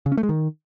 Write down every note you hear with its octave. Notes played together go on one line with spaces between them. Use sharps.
C#3
C#4
A3
G#3
D#3